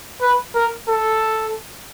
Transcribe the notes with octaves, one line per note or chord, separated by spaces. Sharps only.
B4
A#4
A4